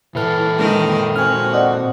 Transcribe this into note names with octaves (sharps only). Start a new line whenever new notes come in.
A#2 E3 E4 A4 B4 G5 F6
D#3 G#3 A#3 A#4
C4 F#4 G#5 F6
D5 D#5 F#5